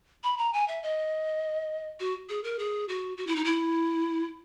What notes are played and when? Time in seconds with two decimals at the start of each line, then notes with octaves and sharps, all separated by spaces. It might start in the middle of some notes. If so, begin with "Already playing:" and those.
0.24 B5
0.38 A#5
0.53 G#5
0.68 E5
0.83 D#5
2.00 F#4
2.29 G#4
2.44 A#4
2.59 G#4
2.88 F#4
3.17 F#4
3.27 E4
3.36 D#4
3.44 E4